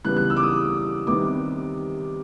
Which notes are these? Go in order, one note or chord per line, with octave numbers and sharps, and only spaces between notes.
C#3 E3 G3 B3 F#6
F#6
E6
D6
D#6
C3 D#3 G3 B3 D6